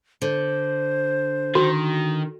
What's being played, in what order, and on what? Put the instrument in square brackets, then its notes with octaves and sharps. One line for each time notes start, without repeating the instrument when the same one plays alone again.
[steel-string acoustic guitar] D3 [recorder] C5
[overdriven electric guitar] D#3 [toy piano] F#4